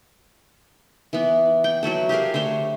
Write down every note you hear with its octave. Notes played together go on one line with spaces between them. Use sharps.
E3 B3
G5
F#3 E4 F#4 A4
G4 G#4 A#4 F5
D3 A3 C5 C#5